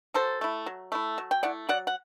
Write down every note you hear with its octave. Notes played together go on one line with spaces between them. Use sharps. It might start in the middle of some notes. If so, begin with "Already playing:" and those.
F#3 A4 C5
A3 E4
F#3
A3 E4
F#3
G5
A3 E4 D5 F#5
F#3 D5 F#5
F#5